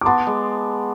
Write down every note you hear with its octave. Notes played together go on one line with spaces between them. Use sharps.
D6
B3 A5 C6
G#3